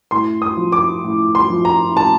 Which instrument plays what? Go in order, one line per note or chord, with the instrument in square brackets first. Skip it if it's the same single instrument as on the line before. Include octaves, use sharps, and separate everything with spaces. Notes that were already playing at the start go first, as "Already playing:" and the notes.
[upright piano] A2 C6
D#6
F3
D6
A2
C6
F3
A#5
A2 A5